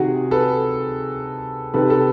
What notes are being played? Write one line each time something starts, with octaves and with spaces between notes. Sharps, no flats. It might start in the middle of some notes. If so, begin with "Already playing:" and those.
Already playing: C3 D#3 F#4 G#4
A4 B4
C3 D#3 A4 B4
A4 B4